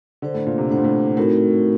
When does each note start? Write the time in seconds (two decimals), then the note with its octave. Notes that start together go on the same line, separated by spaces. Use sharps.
0.22 D3 D4 A4 C5 F#5
0.34 A2
0.47 A#2
0.58 C3
0.69 A2 D4 A4 C5 F#5
0.77 A#2
0.84 A2
1.17 A2 A3 C4 D#4 F#4 A#4